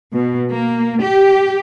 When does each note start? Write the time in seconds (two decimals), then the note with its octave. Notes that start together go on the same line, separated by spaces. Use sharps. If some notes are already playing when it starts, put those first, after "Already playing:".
0.13 B2
0.52 A#3
1.03 G4